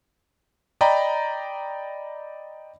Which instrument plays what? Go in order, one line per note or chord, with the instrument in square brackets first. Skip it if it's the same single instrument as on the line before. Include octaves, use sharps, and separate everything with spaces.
[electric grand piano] D5 D#5 G5 A#5 B5